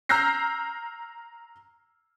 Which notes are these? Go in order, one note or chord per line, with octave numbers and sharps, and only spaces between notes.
A#5 E6 F6 G6 A#6 C7